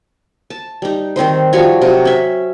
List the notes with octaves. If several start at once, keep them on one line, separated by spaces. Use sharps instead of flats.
A5
G3 D#4
D#3 C4 D#4 C5
F3 G3 F#4 C#5
C3 F#3
C#4 E5